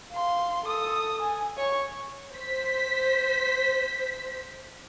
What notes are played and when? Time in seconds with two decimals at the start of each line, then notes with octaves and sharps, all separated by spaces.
0.13 F5 C6
0.66 A4 D#6
1.22 G#5
1.57 C#5 C#6
2.33 C5 B6